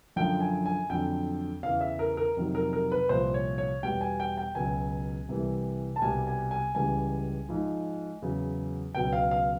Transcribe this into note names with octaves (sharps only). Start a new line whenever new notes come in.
F#2 D3 F3 G5
G#5
G#5
F2 D3 F#3 G5
E2 C#3 E3 F5
E5
A#4
A#4
F2 C3 D#3 F#3
A#4
A#4
B4
C2 A#2 F3 C5
C#5
C#5
E2 B2 G3 G5
G#5
G5
G5
C#2 B2 F#3 G#5
C2 C3 E3 G3
A5
C2 B2 G3 G#5
G#5
G#5
C#2 C#3 E3 G3 G#5
G#2 F3
E2 C#3 F#3
C#2 B2 F#3 G5
F5
F5